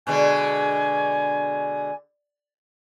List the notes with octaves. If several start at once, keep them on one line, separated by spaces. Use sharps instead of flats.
B2 D3 G#3 G#5